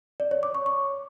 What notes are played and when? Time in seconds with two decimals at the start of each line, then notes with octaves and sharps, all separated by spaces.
0.20 D5
0.31 C#5
0.43 D6
0.55 C#6
0.66 C#6